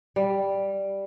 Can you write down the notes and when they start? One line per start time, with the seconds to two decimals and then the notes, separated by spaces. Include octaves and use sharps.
0.16 G3